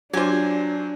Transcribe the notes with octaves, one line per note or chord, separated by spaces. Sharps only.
F#3 D4 F4 G4 C5 G#5